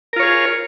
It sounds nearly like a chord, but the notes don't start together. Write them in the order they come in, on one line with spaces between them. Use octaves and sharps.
A#4 F4 C#5 G#4